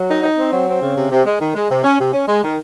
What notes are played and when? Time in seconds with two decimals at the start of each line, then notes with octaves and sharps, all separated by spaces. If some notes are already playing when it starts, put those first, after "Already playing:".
Already playing: F#3
0.09 D#4
0.23 D#4
0.38 C4
0.53 F#3
0.68 C4
0.82 C#3
0.96 C3
1.11 C3
1.25 G#3
1.40 D#3
1.54 G#3
1.70 C3
1.84 C#4
1.99 C3
2.13 C#4
2.27 G#3
2.43 D#3